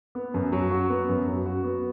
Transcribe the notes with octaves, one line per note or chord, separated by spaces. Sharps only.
B3
F#2
F#3
F#4
B3
F#2
F#3
F#4
B3